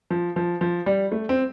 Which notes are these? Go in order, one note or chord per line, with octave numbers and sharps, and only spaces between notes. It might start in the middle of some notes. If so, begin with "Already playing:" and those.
F3
F3
F3
G3
A3
C4